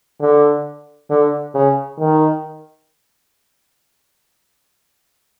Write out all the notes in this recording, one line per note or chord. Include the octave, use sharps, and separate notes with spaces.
D3
D3
C#3
D#3